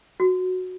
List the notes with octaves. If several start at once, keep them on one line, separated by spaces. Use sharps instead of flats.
F#4